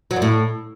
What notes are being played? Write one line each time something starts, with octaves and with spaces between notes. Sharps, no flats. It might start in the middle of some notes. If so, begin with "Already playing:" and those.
F#3
F#2
A2